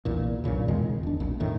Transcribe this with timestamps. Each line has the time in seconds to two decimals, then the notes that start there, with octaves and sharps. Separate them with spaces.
0.05 A#1 E2 A#2
0.44 B1 G2 A#2 C#3
0.68 E2 B2 D#3 G#3
1.03 D1 D4
1.20 A#1
1.40 F2 A2 D#3